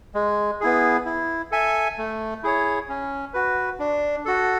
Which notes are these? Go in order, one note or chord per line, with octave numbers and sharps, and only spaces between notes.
G#3
B3 E4 G#4
E4
A4 E5 G#5
A3
E4 G#4 C#5
C#4
F#4 B4
D4
F#4 A4